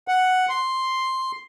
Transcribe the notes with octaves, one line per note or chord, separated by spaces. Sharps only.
F#5
C6